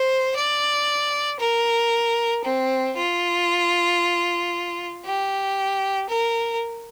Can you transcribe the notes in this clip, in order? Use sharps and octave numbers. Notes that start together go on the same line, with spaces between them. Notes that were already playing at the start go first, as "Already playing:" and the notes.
Already playing: C5
D5
A#4
C4
F4
G4
A#4